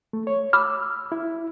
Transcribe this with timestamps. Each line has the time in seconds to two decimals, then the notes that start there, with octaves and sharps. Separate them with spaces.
0.13 A3
0.27 C#5
0.53 B5 D6 E6 F6
1.12 E4